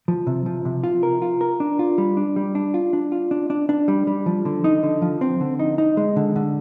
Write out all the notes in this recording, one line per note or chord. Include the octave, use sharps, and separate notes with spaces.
F3
C3
F3
C3
F4
A#4
F4
A#4
D4
F4
G3
D4
G3
D4
F4
D4
F4
D4
D4
D4
G3
G3
F3
D3
D#4
D3
F3
C4
D3
D#4
D#4
G#3
D3
D3